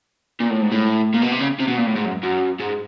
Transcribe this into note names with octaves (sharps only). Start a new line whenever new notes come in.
A#2
A2
G#2
A2
A#2
B2
C3
C#3
C3
B2
A#2
A2
G#2
F#2
F#2
G#2